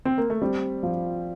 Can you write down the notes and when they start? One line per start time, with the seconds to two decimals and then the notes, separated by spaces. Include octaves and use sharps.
0.05 C4
0.18 A#3
0.30 A3
0.42 G3 C4
0.83 F3